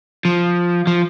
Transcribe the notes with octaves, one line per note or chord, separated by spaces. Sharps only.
F3
F3